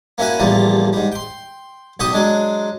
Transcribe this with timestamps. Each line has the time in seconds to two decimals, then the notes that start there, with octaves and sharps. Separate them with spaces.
0.18 A#3 C#4 E4 F#4 G#5
0.39 A1 E2 F3 G3 A#3
0.93 G#2 G3
1.12 G5 C6
2.00 B1 G4 G5 C#6 D#6
2.12 F#3 G#3 D4